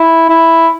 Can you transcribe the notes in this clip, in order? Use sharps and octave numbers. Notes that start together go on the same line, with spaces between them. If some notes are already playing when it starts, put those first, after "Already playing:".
Already playing: E4
E4